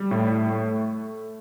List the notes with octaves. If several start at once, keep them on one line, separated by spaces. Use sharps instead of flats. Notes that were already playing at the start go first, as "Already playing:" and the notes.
Already playing: G3
A2
A3